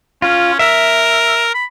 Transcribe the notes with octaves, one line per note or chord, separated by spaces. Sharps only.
C#4 F4
A#4 E5
B5